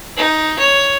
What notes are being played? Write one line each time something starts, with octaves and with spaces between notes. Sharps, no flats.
D#4
C#5